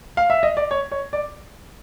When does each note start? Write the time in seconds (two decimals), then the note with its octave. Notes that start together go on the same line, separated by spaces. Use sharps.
0.17 F5
0.30 E5
0.43 D#5
0.57 D5
0.71 C#5
0.92 C#5
1.13 D5